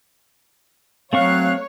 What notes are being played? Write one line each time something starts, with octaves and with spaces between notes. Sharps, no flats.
F#3 A3 C4 C#5 F5 C#6 F#6